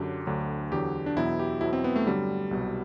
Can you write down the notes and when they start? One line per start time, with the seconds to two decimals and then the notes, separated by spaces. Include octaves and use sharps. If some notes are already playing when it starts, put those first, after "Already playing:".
Already playing: F#2 D3 F#3 G4
0.26 D2 D3 F#3
0.71 E2 D3 F#3 G4
1.06 D4
1.16 E2 B2 F#3 E4
1.39 G4
1.61 E2 B2 F#3 E4
1.73 C4
1.84 B3
1.96 A3
2.06 G2 D3 F#3 G3
2.51 C2 B2 F#3